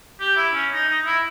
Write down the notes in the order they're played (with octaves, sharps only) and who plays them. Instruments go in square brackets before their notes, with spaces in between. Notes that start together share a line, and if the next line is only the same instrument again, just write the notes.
[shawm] G4
E4
C#4
D#4
D#4
E4